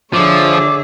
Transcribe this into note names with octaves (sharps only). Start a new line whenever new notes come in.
D3 F3 G#4 C#5 E5 D6